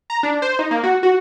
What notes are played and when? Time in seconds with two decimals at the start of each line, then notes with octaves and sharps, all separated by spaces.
0.10 A#5
0.23 D4
0.42 C5
0.59 D#4
0.71 A#3
0.84 F#4
1.03 F#4